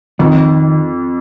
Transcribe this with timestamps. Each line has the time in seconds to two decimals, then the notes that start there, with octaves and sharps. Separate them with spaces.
0.19 F2 D#3